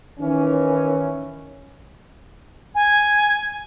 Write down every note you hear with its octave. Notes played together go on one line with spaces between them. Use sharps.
D#3 E3 C#4
G#5